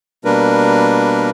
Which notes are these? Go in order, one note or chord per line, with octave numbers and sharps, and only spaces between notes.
B2 G3 A#3 D4 A#4 B4